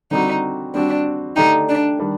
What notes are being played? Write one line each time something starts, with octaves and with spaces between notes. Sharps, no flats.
D3 G3 C4 D#4 F#4
G3 C4 D4 F#4
D3 A3 D4 D#4 G4
D4
D#3 G3 D4